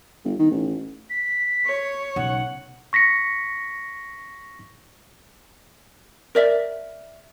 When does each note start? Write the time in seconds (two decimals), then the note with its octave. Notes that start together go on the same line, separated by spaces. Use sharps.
0.24 G1
0.39 D#3
0.51 A1
1.10 B6
1.66 C#5
2.16 B1 C#3 F#5
2.93 C#6 A#6 B6 C#7
6.35 A#4 D5 E5